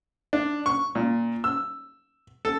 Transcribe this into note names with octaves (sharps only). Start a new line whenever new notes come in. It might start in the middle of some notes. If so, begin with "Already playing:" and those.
D4
C#6
A#2
E6
A4